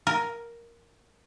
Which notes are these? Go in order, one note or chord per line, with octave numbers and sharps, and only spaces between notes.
A#4